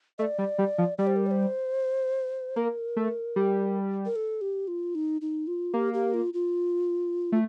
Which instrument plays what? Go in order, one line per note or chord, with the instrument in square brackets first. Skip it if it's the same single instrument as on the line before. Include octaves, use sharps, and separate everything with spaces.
[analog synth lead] A3 [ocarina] D#5
[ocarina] D5
[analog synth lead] G3
G3
F3
[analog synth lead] G3 [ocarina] D5
[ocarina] C5
A#4
D5
C5
[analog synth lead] A#3 [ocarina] A#4
[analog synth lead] A3
G3
[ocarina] A#4
A4
G4
F4
D#4
D#4
F4
[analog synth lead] A#3 [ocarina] G4
[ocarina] G4
F4
F4
[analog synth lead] A3 [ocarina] F4